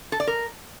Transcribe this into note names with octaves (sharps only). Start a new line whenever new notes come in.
A4
D5
A#4